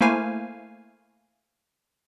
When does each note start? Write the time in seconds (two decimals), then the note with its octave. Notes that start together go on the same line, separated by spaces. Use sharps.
0.01 A3 A#3 E4 C5 F5 G#5